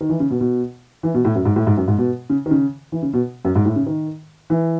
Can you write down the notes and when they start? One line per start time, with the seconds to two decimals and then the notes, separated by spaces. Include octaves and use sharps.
0.01 D#3
0.09 E3
0.20 C#3
0.30 B2
0.41 B2
1.03 E3
1.14 B2
1.25 A2
1.35 F#2
1.45 G#2
1.56 A2
1.67 G#2
1.77 F#2
1.88 G#2
1.98 B2
2.30 C#3
2.46 D#3
2.51 C#3
2.92 E3
3.03 C#3
3.13 B2
3.45 F#2
3.56 G#2
3.65 A2
3.76 C#3
3.86 D#3
4.50 E3